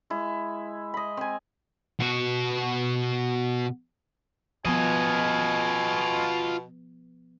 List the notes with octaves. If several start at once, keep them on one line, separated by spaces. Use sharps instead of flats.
G#3 E4
D#5 B5
C4 G#5
B2 F#4
B2 F3 B3 F4 D#5 G#5